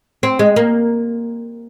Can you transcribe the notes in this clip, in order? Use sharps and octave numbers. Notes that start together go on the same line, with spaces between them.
C4
G#3
A#3